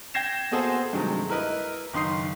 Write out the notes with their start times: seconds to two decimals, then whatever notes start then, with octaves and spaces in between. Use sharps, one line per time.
0.14 G5 G6 G#6 A#6 C7 E7
0.51 A#3 B3 F#4 G#4 A4 C5
0.93 G2 C3 D#3 F#3 G#3 A3
1.29 E4 A#4 B4 D#5
1.94 F#1 D#3 C6 D#6 C7